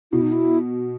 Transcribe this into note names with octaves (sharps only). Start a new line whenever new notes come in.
B2 E4
D#4
E4